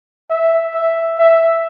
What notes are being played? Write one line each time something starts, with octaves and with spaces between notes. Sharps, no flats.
E5
E5
E5